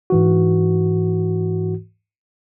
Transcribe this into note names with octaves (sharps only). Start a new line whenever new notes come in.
G#2 E3 F#4